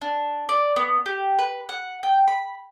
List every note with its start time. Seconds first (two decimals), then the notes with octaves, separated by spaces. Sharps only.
0.01 D4
0.49 D5
0.76 B3
1.06 G4
1.39 B4
1.69 F#5
2.03 G5
2.28 B5